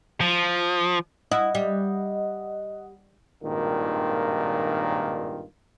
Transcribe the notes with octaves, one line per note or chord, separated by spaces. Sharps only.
F3
E4 D#5 F#5
G3
G#1 G2 A#2 D#3 F4